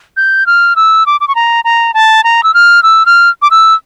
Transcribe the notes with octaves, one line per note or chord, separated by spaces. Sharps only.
G6
F6
E6
D6
D6
C#6
A#5
A#5
A5
A#5
E6
F6
E6
F6
D6
E6